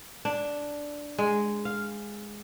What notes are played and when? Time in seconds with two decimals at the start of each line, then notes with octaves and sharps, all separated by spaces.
0.25 D4
1.18 G#3
1.65 F5